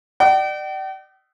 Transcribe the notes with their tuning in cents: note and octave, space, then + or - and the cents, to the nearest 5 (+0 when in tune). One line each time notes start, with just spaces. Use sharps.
D5 +35 G5 -45